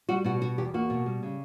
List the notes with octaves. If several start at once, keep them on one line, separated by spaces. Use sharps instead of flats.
G3 F#4
B2 F#4
G3 F#4
E2 G4
A#3 F#4
B2
G3
C#3